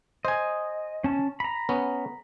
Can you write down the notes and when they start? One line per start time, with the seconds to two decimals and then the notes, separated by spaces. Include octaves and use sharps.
0.25 C5 D#5 G#5
1.04 C#4 A5
1.40 A#5 B5
1.69 B3 C#4